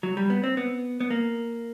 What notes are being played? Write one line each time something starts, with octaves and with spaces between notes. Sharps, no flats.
F#3
G3
B3
C4
B3
B3
A#3